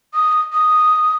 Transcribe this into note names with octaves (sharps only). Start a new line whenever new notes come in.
D#6
D#6